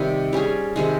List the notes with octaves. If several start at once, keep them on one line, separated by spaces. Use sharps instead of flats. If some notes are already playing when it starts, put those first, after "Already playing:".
Already playing: C3 D#3 G3
G3 C#4 G#4
C3 D#3 G#3